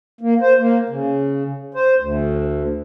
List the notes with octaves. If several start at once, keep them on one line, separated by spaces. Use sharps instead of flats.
A#3
C5
A#3
C#3
C5
D2